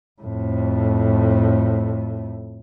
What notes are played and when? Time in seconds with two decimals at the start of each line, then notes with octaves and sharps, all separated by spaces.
0.21 F2 A2